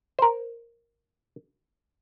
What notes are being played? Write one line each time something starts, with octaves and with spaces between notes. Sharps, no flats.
A#4 C5